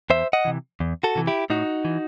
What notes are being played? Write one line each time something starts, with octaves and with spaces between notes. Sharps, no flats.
E2 C5 E5
D#5 F#5
C3 E3
E2
F#4 A4
C3 E3
E4 G4
A2 D#4 F#4
E3